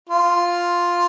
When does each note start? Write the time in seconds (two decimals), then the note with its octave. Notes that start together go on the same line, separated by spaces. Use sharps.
0.09 F4